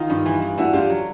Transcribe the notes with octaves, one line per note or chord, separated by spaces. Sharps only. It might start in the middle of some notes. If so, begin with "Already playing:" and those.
Already playing: D#3 D#4 F4
G2
E3
E3
D3 E4 F#4
D3 F4 G4
F#3